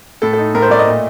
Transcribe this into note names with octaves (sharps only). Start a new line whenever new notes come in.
A2 A4
A4
D#4
A2 A#4
C5
A3 D5
D#5
A#2